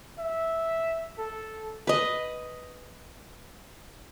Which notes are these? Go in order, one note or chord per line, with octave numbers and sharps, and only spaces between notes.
E5
A4
B4 D#5